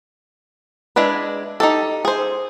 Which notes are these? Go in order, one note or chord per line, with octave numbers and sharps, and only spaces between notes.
G#3 D4 E4 B4
D#4 G4 A4
G#4 C5